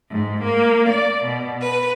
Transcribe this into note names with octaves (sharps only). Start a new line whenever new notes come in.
G#2
A#3
D5
B2
B4